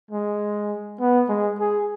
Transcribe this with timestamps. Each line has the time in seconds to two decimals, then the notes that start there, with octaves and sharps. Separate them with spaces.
0.11 G#3
1.00 B3
1.29 G#3
1.60 G#4